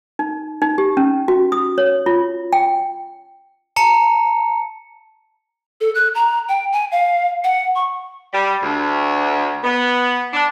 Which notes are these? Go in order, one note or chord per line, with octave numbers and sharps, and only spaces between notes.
D#4
D#4
G4
C#4
F#4
D#6
C#5
F4
G5
A5 A#5 C#7
A4
F#6
A#5
G5
G#5
F5
F#5
C#6
G3
D2
B3
D4